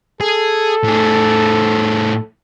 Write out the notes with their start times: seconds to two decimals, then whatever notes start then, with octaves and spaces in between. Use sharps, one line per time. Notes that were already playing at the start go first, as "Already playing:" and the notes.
0.21 G#4 A4
0.84 A2 G#4